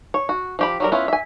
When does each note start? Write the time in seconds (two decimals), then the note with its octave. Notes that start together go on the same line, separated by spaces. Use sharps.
0.14 C#5
0.29 F#4
0.59 F3 G4 B5
0.80 F#3 G3 A#4
0.92 B3 C#4 E4 F4
1.08 E5 G#5